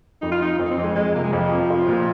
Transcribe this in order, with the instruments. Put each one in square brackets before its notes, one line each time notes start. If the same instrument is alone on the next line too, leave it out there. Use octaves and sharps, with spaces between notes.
[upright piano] F2 [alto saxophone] D#4
[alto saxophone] F4
[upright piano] F3 [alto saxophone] D#4
[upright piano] F2 [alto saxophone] C4
[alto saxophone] D#4
C4
[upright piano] F2
[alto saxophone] G#3
[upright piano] F2 [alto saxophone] G#3
[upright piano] C3 [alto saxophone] A#3
[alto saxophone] G#3
[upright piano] F2 [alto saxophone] F3
[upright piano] F2
F4
A#2